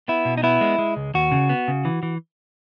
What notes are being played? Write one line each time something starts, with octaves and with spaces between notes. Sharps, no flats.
B3 E4
B2
D#4
B3 E4
G#3
G#3
C#2
D#2 F#4
C#3
B3
C#3
E3
E3